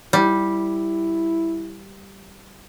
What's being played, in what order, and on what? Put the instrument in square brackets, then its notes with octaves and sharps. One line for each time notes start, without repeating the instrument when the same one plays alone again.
[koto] G3 [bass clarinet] E4